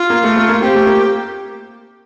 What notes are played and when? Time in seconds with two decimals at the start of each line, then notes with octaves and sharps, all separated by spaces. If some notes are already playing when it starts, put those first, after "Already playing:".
Already playing: F4
0.10 A#3
0.23 A3
0.36 A3
0.48 A#3
0.62 C4 G4
0.75 A3
0.87 A#3